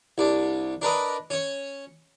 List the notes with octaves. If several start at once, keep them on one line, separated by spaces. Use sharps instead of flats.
C2 D4
D4 A#4 B4 D#5
C#4 C#5